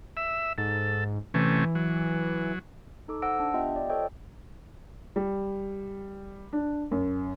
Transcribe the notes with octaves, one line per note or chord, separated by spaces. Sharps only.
E5
G#2 A4
C3 E3 A3 C#4
F#3
D#4 A4 D6
C5 F#5 E6 A#6 D7
D4
B3 F4 G4 D#5 E5 G5
F4 D5
A4 C5 C#5 D#5 G5
G3
D4
F#2